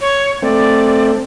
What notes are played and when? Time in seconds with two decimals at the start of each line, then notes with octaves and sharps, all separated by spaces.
0.01 C#5
0.42 A3 C4 D5